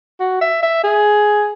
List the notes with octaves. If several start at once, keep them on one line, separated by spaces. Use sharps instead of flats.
F#4
E5
E5
G#4